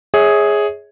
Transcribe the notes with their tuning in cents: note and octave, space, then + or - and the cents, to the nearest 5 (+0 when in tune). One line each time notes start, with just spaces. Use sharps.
G#4 +0 C#5 +5 E5 -30